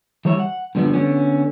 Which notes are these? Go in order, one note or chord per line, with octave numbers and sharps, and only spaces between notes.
E3 G3 C#5 E5
F#5
G2 A#2 D3 F3 G3 B3
D3 B3 C#4